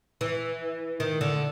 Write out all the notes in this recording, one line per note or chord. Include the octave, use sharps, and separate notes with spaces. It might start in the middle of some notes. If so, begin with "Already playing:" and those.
E3
D#3
D3